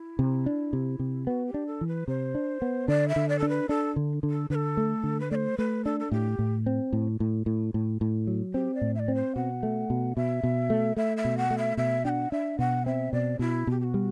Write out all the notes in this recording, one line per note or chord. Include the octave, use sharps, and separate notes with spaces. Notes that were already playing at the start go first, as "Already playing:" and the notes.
Already playing: E4
C3
D4
C3
C3
B3 F#4
G4
D4
A4
E3
B4
C3 C5
D4
B3
D3 D5
E5
D3
D5
D4 A4
B4
D4 A4
D3
D3
A4
D3 B4
A4
A3
D3
B4
A3 C5 D5
A3 B4
D4 A4
A4
A2 G4
A2
C4
A2
A2
A2
A2
A2
F#3
C4 G4
D5
A2
E5
D5
C4
C5
B2 F#5
A3
B2
B2 E5
B2
A3
A3 E5
E5
B2
F#5
A3
E5
B2 E5
D4 F#5 G5
D4 E5
B2 F#5
C4 E5
B2 D5
B2 E4
B2 G4
G4
F#4
G3